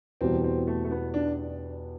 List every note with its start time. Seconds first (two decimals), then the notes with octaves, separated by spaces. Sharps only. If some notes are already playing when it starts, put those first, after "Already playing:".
0.21 E2 B2 G3 C4
0.44 C4
0.67 A3
0.85 A3
0.91 B3
1.14 D4